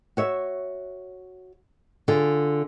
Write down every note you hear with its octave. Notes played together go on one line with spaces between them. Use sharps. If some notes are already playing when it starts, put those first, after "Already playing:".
F#4 C#5 E5
D3 F4 G#4